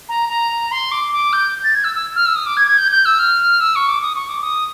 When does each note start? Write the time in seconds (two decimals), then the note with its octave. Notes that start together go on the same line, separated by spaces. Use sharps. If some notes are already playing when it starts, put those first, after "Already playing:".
0.09 A#5
0.29 A#5
0.71 C6
0.91 D6
1.12 D6
1.33 G6
1.63 A6
1.75 G#6
1.84 E6
1.95 E6
2.16 F6
2.26 E6
2.35 D#6
2.46 D6
2.56 G#6
2.67 G#6
2.78 G6
2.91 G6
3.05 E6
3.19 F6
3.60 E6
3.75 C#6
3.88 D6
4.02 D#6
4.15 C#6
4.29 D6
4.42 D#6